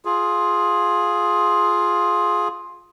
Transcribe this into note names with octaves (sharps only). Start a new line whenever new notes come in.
F4 G#4